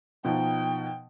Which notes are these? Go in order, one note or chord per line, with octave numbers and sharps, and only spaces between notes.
B2 F3 D#4 G5